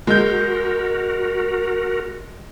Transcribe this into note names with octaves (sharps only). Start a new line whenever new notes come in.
G#3 F#4 A#4 G6